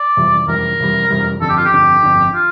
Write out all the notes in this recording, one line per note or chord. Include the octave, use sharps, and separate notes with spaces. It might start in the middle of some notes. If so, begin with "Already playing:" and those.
Already playing: D5
F2 C3 E3 G3
F2 C3 E3 G3 A#4
F2 C3 E3 G3
F2 C3 E3 G3
G1 F2 D3 A4
G4
F4
G4
G1 F2 D3
G1 F2 D3
F4